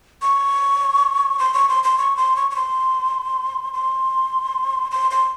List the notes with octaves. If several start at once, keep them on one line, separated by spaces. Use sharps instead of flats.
C#6
C6
C#6
C6
C6
C#6
C6
C#6
C#6
C6
C6
C6
C6